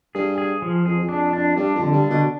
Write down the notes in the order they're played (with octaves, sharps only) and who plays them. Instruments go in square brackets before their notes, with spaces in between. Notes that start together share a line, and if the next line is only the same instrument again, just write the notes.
[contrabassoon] G2 [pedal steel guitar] G#4
[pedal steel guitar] G#4
F3
[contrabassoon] F2 [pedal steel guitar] G#4
[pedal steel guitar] D4
D4
[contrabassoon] G2 [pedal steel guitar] D4
[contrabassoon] F2 [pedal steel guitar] D3
[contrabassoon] G2
[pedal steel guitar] D4
[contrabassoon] B2